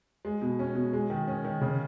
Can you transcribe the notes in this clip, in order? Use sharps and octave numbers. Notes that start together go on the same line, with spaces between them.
G#3
B2
C#4
B2
G#3
D#3
C#4
D#3
C#3